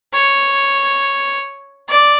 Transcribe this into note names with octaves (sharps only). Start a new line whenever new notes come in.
C#5
D5